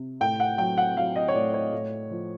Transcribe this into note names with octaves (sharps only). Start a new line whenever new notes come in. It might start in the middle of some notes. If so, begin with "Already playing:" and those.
Already playing: C3
A2 G5
F#5
F#3 G5
F#5
F#3 F5
D#5
C#5
A2 D5
C#5
A2
F3